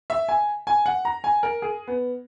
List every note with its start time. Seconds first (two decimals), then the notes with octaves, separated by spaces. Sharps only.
0.10 E5
0.29 G#5
0.67 G#5
0.86 F#5
1.05 A#5
1.24 G#5
1.43 A#4
1.62 G#4
1.88 B3